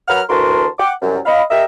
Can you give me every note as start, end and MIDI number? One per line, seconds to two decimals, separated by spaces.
0.08 0.22 54
0.08 0.22 70
0.08 0.22 71
0.08 0.22 78
0.08 0.22 89
0.29 0.67 38
0.29 0.67 52
0.29 0.67 66
0.29 0.67 70
0.29 0.67 81
0.29 0.67 84
0.79 0.93 78
0.79 0.93 79
0.79 0.93 86
1.01 1.18 36
1.01 1.18 42
1.26 1.43 75
1.26 1.43 77
1.26 1.43 83
1.50 1.64 67
1.50 1.64 70
1.50 1.64 75
1.50 1.64 76